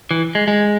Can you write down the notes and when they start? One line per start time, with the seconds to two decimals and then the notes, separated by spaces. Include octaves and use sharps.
0.11 E3
0.35 G#3
0.48 G#3